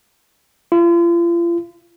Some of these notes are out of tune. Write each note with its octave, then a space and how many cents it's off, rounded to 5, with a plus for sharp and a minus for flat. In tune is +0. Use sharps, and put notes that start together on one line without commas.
F4 -40